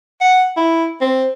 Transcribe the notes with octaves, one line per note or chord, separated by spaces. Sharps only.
F#5
E4
C4